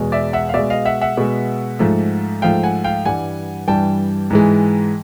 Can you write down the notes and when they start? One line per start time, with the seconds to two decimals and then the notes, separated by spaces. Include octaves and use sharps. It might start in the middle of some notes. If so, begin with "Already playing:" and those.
Already playing: E2 B2 G#3
0.12 D5 E5
0.33 E5 F#5
0.49 F5
0.54 B2 G#3 D5 E5
0.70 D#5 F5
0.85 E5 F#5
1.01 E5 F#5
1.17 B2 G#3
1.79 G#2 F3 A3
2.42 G#2 F3 A3 F5 G5
2.63 F#5 G#5
2.84 F5 G5
3.05 G2 E3 G3 F#5 G#5
3.67 G2 E3 G3 G5 A5
4.30 G#2 E3 G#3